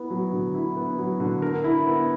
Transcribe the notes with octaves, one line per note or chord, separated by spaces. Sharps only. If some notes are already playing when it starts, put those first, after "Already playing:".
Already playing: B3 E4
F#3
D3
E4
B3
F#3
D3
A#4
E4
B3